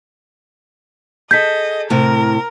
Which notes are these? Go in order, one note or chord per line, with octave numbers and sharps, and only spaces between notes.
G#4 A4 D#5 G6 B6
A2 C3 A#4